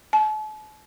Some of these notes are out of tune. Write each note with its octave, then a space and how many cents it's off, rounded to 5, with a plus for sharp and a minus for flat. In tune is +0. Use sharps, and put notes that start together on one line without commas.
A5 -40